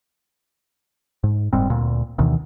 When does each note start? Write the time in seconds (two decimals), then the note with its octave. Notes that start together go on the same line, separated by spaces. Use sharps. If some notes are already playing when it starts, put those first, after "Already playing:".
1.24 G#2
1.53 F#1 G#2 G3 C4
1.70 D2 A#2
2.18 D2 B2 D#3 E3